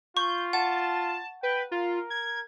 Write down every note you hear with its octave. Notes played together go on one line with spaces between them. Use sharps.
F4 C#6 G6
F#5 A5
B4 G5
F4 A#4
G#6